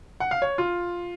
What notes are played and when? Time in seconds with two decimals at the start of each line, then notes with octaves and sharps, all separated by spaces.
0.20 F#5
0.31 F5
0.42 C#5
0.58 F4